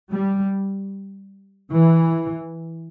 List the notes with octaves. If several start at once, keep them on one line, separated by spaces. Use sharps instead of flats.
G3
E3